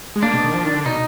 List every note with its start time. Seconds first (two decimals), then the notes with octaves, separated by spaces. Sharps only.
0.16 G#3
0.23 A#3 D4
0.34 B2
0.44 D#3
0.54 F3
0.64 D#3
0.74 D3
0.86 B2 D#4